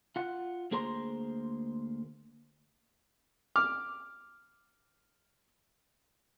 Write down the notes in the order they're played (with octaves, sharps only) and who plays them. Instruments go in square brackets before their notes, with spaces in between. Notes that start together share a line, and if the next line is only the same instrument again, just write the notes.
[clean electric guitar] F4 F#5
D2 A#3 G#4 C5 A#5 C6
[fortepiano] D6 F6